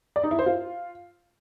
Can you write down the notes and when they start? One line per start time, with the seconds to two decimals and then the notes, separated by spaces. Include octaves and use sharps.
0.16 D5
0.23 D#4
0.31 E4
0.39 C5
0.46 F4